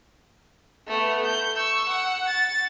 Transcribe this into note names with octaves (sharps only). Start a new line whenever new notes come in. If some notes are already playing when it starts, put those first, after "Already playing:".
A3 B3
G6
C#6 E6
F#5
A6